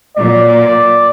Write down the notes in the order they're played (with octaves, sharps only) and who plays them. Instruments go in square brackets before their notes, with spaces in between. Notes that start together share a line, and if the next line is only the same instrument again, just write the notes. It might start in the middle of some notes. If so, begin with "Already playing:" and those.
[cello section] A#2 F#3 A#3 [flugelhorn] D5